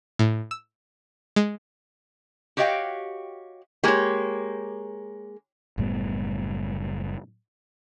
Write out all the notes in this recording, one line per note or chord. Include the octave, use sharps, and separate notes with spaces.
A2
E6
G#3
F#4 G4 C#5 D#5 F5 G5
G#3 A#3 G4 C#5
F#1 A2 G3 B3